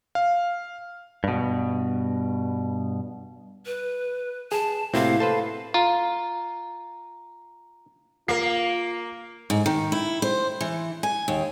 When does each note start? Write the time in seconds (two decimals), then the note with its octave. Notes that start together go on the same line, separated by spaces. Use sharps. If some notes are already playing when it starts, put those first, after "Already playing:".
0.15 F5
1.24 G2 B2
3.65 B4
4.52 G#4 A5
4.94 A2 C3 A#3 C4 E4 F#4 F5
5.20 A4 B4 C5 A5
5.74 F4 A#5
8.28 A#3 F4 A#4 C7
9.50 G#2
9.66 D#3
9.92 E4
10.22 C5
10.61 E3
11.03 G#5
11.28 D#2